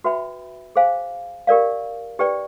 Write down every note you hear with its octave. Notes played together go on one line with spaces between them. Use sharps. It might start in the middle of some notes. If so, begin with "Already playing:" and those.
F#4 B4 E5 G5 B5
G#4 C5 F5 G#5
G4 A#4 D5 F5
D#4 G4 B4 D5 G5